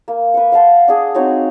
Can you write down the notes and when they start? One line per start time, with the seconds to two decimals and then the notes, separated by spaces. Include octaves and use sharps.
0.08 A#3
0.34 B4 C#6
0.52 F5 F#5 A5 C6
0.88 D4 G#4
1.15 C4 D#4 F#4 C#5